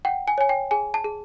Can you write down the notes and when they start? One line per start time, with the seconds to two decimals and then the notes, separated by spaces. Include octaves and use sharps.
0.05 F#5 G5
0.28 G#5
0.38 C#5 G#5
0.49 G5
0.71 G#4 G#5
0.94 A5
1.05 G#4